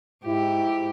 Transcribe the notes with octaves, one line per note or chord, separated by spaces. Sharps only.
G#2 E4 G4